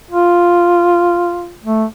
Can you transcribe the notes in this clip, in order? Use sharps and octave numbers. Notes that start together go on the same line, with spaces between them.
F4
A3